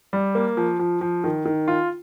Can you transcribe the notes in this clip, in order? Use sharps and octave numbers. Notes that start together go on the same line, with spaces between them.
G3
A#3
F3
F3
F3
D#3
D#3
F4